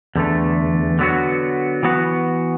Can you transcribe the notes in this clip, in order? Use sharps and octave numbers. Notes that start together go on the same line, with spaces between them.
E2 D3 A3
D3 F#3 B3 F#4
E3 B3 F#4